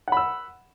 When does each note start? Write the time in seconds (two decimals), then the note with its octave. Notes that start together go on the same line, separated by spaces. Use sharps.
0.08 F#5
0.12 B5
0.17 E6